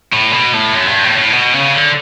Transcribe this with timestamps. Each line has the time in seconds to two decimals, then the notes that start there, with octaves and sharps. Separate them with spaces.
0.12 A2
0.33 B2
0.53 A2
0.73 F#2
0.88 G2
1.04 A2
1.18 A2
1.33 B2
1.54 C#3
1.74 D3